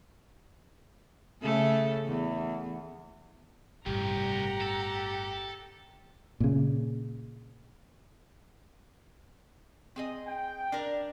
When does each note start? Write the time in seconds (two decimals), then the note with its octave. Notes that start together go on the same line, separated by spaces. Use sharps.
1.42 C#3 A3 A4
2.07 E2
3.86 G1 C2 A2 G4 F#5 A#5
4.61 A4
6.40 A#2 C#3
9.96 C4 G#4 D#5
10.27 G5
10.72 D4 A#4